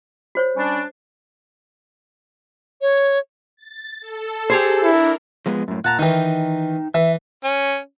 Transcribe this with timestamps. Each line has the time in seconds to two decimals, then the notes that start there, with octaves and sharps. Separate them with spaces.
0.35 F#4 C5 C#5
0.57 G3 C#4 D4
2.81 C#5
3.57 A6
4.01 A4
4.50 G4 G#4 C5
4.84 D4 E4 A#4
5.46 F3 G#3 B3
5.68 F#2 A2
5.84 A#2 F#5 A5 A#5
5.99 D#3 E3 D#4 G5
6.94 E3 E5
7.44 C#4